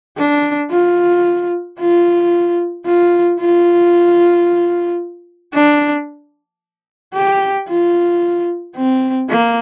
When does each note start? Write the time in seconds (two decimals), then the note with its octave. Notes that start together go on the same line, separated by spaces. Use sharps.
0.18 D4
0.71 F4
1.79 F4
2.85 F4
3.40 F4
5.54 D4
7.14 G4
7.68 F4
8.76 C4
9.29 A#3